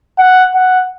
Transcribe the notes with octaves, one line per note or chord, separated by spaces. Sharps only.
F#5
F#5